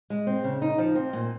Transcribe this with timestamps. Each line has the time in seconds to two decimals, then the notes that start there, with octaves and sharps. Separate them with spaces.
0.10 G#3
0.27 C4
0.44 C#3
0.62 D#4
0.78 F3
0.95 C4
1.13 A#2